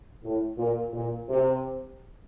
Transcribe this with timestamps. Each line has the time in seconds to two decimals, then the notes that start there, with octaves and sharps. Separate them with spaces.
0.23 A2
0.58 A#2
0.93 A#2
1.29 C3